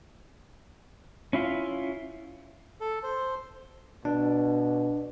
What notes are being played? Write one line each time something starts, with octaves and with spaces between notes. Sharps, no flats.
C#4 E4 F4
A4
C5
B2 D4